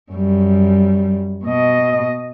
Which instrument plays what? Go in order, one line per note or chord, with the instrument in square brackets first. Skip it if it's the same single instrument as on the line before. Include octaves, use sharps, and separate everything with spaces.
[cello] F#2 G3
B2 D#5